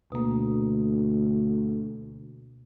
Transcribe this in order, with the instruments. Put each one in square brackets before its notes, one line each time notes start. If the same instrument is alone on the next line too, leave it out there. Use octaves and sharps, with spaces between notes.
[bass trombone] D2 [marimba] B2 A#3